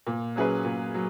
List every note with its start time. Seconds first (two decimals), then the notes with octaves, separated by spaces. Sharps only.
0.07 A#2
0.36 F#3 C#4 G#4 B4
0.65 A#2
0.94 F#3